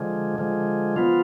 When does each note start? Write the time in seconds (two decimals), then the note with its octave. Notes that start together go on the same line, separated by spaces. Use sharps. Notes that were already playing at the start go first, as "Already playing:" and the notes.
Already playing: D3 F3 G#3
0.38 D3 F3 G#3
0.96 F3 B3 F4